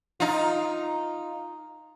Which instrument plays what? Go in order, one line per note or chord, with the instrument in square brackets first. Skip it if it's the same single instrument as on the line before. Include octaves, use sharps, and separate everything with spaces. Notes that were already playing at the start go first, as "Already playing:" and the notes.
[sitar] D#4 F4